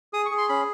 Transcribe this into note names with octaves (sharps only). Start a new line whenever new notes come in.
G#4 D#6
C#6
G#4
C6
C#4 B5